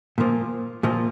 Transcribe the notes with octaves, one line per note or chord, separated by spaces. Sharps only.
A#2 F3 A#3
A#2 F3 A#3